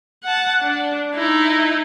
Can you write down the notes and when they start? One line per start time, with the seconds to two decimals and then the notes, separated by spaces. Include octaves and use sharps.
0.24 F#5 A5
0.62 D4
1.15 D#4 E4